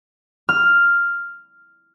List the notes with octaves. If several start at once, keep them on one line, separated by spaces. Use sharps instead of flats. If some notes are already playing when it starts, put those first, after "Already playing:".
F6